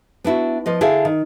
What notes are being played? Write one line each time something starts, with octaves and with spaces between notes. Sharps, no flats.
B3 D4 E4 F#4
F3 B4 D#5
D3 D4 E4 G#4 E5 F5
D#3